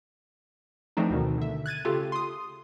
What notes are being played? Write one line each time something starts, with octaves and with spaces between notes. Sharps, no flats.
E3 F3 A3 C4 D4 D#4
D2 B2 D#3
D3 E5
F#6 G#6 A6 D#7
C#3 A3 F4 G4 A4
C6 D#6